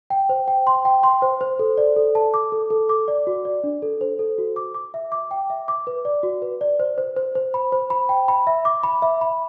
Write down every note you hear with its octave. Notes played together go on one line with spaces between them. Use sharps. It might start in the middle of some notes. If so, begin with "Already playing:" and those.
G5
C5
G5
C6
G5
C6
C5
C5
A4
D5
A4
A5
D6
A4
A4
D6
D5
F#4
D5
D4
A4
C5
A4
F#4
D6
D6
E5
D6
G5
E5
D6
B4
D5
F#4
B4
D5
C5
C5
C5
C5
B5
C5
B5
G5
B5
E5
D6
B5
E5
B5